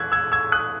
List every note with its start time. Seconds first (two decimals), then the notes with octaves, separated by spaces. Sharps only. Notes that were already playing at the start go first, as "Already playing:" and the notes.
Already playing: E2 G#3 E6 F#6 G#6
0.12 E6 G#6
0.32 E6 G#6
0.52 D#6 F#6